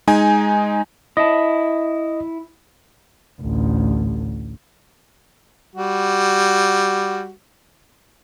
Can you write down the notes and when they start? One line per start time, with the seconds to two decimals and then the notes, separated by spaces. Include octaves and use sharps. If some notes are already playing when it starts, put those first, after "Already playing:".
0.07 G#3 D#4 G#5
1.17 E4 D#5 A5
3.41 A1 D2
5.76 G3 F#4